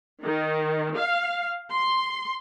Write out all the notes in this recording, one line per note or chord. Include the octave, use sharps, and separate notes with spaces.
D#3
F5
C6